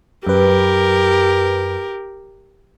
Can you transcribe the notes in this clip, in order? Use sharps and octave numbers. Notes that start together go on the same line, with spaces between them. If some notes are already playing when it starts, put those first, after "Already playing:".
F#2 G4 A#4 B4